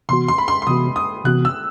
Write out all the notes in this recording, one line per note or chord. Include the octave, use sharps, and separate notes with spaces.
C3 E3 B3 F#4 C6
C6
B5
C6
C6
C3 E3 B3 F#4 D#6
D#6
C3 E3 B3 F#4 F#6
E6